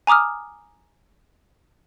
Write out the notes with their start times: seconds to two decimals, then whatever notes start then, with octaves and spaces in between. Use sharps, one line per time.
0.07 G#5 A#5 D6 D#6 F6